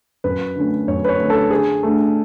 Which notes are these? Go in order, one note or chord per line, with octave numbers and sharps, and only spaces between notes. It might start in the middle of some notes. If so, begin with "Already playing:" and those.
F#2 B4
D3 A3 C#4
F#2 C#5
B4
C#5
D3 A3 C#4
A4
D3 G#4
A3 D4